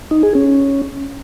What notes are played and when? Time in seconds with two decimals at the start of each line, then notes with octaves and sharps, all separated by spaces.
0.11 D#4
0.23 G#4
0.35 C#4